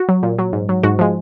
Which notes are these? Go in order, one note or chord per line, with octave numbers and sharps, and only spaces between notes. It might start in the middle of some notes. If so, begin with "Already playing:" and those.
Already playing: F#4
F#3
A#2
F#3
G#2
F#3
G#2 F#4
F3 G#3